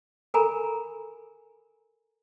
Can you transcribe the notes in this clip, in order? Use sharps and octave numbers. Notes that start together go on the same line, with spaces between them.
A4 A#4 G#5 A#5 B5